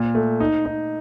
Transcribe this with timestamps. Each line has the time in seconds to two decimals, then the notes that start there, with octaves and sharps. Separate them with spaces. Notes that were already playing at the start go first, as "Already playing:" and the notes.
Already playing: A#2
0.15 A3
0.40 D#4
0.65 D#4